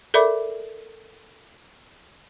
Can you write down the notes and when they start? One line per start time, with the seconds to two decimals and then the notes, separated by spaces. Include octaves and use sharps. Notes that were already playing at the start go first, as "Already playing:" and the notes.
0.14 A4 A#4 D5 E5 B5 D6